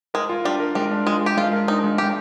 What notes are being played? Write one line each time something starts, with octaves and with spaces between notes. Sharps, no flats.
G#3 A#4
F4
G3 D4
A#4
G3 G#3
D4
G#3 F4
G4 A#4
G#3 F4
A#4
D4 D#4
G#3
G#3 G4